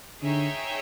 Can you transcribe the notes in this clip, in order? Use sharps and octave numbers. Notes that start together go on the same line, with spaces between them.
D3 D#4 G#4 C#5 E5 G5